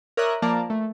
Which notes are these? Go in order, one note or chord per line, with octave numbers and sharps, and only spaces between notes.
A#4 C#5 D5 E5 D#6 F#6
F3 A#3 A#4 D5 A5 A#5
A3